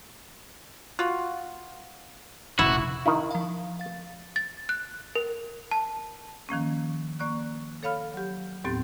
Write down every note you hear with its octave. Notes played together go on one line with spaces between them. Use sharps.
F4 F#4
F1 A#2 E4 F#4
D#3 D#4 E4
F3 F5
F5 A6
A6
F#6
A#4
A5
D#3 F3 A#3 C#4
A#3 D5 C#6 F#6
A4 C#5 F5 B5 F6
F#3 G4
D#2 A2 B3 C4 G4 A6